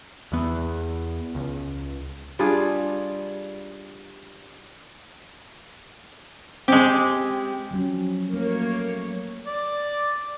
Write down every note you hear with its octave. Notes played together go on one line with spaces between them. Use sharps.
E2 E3 B3
C#2
G3 D4 F4 G#4
G#3 C4 G4
F3 F#3 C#4
A3 A#3 C#5
D5